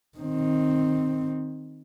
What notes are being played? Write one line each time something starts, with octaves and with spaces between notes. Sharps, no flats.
D#3 C4